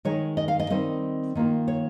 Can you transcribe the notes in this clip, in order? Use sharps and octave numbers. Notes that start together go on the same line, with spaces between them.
D#3 G#3 D#4 C#5
D#5
F5
D#5
D#3 G3 C4 D#4 D#5
D#3 A#3 F4
C#5